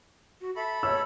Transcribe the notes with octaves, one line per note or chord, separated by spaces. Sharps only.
F#4
A4 E5 B5
C#5 E6